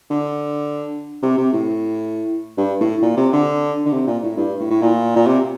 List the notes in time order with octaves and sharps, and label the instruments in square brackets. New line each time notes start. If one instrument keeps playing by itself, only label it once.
[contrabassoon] D3
C3
C3
A2
G2
A2
A#2
C3
D3
D3
C3
A#2
A2
G2
A2
A2
A#2
A#2
C3